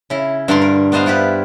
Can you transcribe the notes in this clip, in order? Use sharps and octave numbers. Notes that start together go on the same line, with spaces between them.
C#3 E4
G2 D3 D5 A#5 C6
A#4
B3 D4 C5 D#5 F5
E4 F4 G4 B4